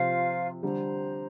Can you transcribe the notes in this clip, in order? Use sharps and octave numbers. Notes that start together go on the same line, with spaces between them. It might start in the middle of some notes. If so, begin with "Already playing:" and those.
Already playing: C3 F3 F4 C5 F5
D3 G3 C5 A#5